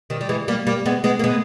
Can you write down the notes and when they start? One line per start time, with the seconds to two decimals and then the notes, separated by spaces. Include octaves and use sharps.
0.10 D#3 G3
0.21 G3
0.29 E3 G#3
0.48 G3 A#3
0.67 G3 A#3
0.86 G#3 B3
1.04 G#3 B3
1.19 A#3
1.24 G#3 B3